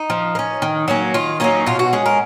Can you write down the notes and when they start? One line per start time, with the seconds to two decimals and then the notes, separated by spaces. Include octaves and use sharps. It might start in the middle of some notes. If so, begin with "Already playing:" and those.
Already playing: D#4
0.10 F3
0.35 A#3
0.39 C#4
0.62 D#3
0.88 F#3 A#3 C#4
1.14 D#3 F4
1.40 F#3 A#3 C#4 D#4
1.66 B2 F4
1.79 F#4
1.93 G#3 C#4
2.06 A#4